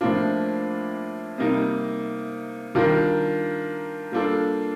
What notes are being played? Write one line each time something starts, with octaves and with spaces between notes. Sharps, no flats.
A2 F3 A#3 D4 F4
C3 G3 A#3 D#4
D#3 G3 D4 F4 A#4
G3 A#3 D4 F4 A4